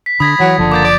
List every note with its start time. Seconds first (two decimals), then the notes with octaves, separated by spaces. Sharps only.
0.06 B6
0.20 D3 B5 D#6 G#6 A#6
0.40 E3 F#3
0.58 F#1 D3 F3
0.72 A#3 D6 G6 A6
0.85 D5